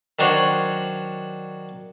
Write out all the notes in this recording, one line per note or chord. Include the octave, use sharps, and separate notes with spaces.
D#3 F#3 D4 F#4 C5 C#5